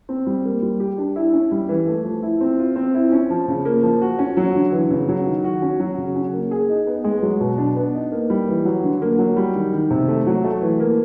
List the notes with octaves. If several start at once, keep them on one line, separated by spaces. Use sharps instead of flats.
C4
G3
A#3
G3
G4
D4
E4
C#4
G3
E3
A3
F3
E4
C4
F4
C4
E4
C#4
F3
C#3
A#3
F3
F#4
C#4
F#3
D3
E3
C#3
F#3
D#3
F#4
C#4
F#3
C#3
C#4
A#3
G#4
D#4
B3
G#3
F#3
B2
D4
B3
D#4
A#3
G3
E3
F#3
D3
A#3
F#3
G3
D#3
D#3
C3
A3
F#3
A3
E3
A#3